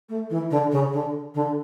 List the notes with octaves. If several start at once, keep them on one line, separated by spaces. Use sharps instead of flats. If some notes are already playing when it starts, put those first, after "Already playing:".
A3
E3
D3
C#3
D3
D3